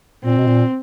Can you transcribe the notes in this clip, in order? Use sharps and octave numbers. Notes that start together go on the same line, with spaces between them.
A#2 C4
B2
A#2